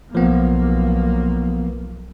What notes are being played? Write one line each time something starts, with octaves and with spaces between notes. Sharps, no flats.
B1 F3 A#3 B3